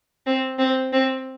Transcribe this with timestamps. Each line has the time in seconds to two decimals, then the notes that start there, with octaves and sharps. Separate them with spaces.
0.26 C4
0.59 C4
0.93 C4